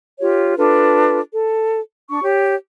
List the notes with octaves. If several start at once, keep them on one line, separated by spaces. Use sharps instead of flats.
F4 G4 C#5
D4 F4 A4 B4
A4
D4 C#6
G4 C#5